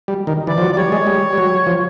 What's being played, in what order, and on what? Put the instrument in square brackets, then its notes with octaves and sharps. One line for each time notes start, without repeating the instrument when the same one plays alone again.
[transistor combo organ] G3
D#3
[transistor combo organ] E3 [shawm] D5
[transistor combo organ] F3
F#3
[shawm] D5
[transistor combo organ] G3 [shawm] C#5
[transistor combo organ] G#3
G3
G3
F#3
F3